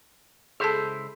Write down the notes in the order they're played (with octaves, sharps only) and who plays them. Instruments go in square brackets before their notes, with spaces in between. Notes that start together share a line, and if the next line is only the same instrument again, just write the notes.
[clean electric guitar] C#2 E4 C5 [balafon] G#4 A4 A5